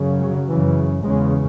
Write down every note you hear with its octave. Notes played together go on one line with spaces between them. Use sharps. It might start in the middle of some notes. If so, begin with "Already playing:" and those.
Already playing: F#2 C#3
F#3
F#2 C#3 E3
E2 C#3 G#3